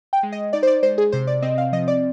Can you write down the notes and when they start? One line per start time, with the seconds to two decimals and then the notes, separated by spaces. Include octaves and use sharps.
0.13 G5
0.23 G#3
0.32 D#5
0.53 D#4 D5
0.63 C5
0.67 D5
0.83 G#3 C5
0.98 G#4
1.12 C3 C5
1.27 D5
1.42 C4 D#5
1.58 F5
1.72 F3 D#5
1.88 D5